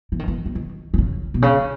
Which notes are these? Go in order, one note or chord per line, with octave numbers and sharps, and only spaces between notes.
E3
D#3
E3
E3
D#3
D#3
C#3
B2
C#3